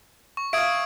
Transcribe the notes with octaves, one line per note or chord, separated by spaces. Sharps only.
C#6
E5 F5 D#6 G#6 D7